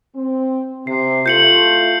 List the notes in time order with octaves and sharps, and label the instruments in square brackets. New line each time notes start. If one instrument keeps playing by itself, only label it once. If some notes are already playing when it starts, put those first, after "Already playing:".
[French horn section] C4
[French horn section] C3 [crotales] C7
[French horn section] A3 E4 F4 [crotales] G6 C#7 F#7